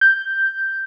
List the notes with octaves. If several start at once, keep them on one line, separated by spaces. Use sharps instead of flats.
G6